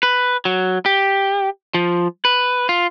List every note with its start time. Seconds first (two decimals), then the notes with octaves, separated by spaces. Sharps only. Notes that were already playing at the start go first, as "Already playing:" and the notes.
0.03 B4
0.45 F#3
0.86 G4
1.74 F3
2.25 B4
2.69 F4